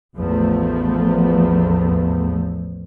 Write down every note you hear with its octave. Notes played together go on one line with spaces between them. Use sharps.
A1 E2 F3 A3